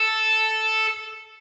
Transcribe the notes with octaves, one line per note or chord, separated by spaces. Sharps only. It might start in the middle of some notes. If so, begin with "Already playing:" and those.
Already playing: A4